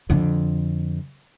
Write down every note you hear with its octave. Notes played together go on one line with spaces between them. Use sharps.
F2 D3